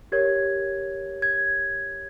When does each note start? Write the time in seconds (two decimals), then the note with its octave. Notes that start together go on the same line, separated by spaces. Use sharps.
0.12 G4 A#4 C#5 G#6
1.22 G#6